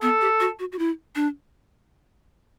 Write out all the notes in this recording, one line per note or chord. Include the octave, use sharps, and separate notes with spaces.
B3 A4
G4
F#4
F#4
F#4
E4
D4